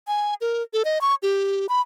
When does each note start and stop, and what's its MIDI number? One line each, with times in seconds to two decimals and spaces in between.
0.07 0.34 80
0.41 0.63 70
0.73 0.83 69
0.85 1.01 75
1.01 1.15 85
1.23 1.67 67
1.69 1.81 83